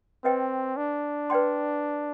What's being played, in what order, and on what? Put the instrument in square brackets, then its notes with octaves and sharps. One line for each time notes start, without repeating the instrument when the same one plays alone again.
[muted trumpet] C4 [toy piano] B4 D#5 G5
[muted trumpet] D4
[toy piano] B4 D5 G5 C6